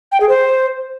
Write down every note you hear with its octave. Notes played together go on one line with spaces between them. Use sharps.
G5
G#4
C5